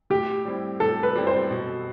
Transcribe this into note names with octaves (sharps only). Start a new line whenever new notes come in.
A2 G4
G3 C4 E4
A2 A4
B4
G3 C4 E4
C5
B2